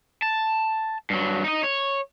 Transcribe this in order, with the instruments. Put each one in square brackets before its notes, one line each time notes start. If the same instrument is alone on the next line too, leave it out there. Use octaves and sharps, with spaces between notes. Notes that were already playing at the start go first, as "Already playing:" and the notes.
[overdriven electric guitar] A5
G2 F#3
D#4 D#5
C#5